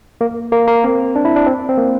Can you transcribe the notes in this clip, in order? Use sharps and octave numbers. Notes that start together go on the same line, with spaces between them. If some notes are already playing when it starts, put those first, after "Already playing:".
A#3
A#3
A#3
C4
D4
E4
D4
C4
C4
A#3